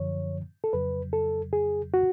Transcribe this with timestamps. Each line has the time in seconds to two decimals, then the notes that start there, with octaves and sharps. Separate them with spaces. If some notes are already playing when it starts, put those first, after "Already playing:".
Already playing: F#2 D3 F3 C#5
0.64 A4
0.73 F2 C#3 F#3 B4
1.13 A4
1.53 G#4
1.94 F#4